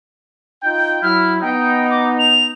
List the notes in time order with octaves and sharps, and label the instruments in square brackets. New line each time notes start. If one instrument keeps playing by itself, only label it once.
[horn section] D#4 F4 G5
[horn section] F#3 E4 [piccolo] F6
[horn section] B3 D#4 [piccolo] G5
[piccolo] D6
F7